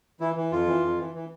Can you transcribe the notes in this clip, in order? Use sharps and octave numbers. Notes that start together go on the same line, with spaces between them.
E3 E4
E3
F2 F4
E3
F2
E3
E3